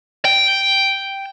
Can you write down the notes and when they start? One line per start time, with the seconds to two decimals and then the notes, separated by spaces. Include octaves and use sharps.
0.25 G5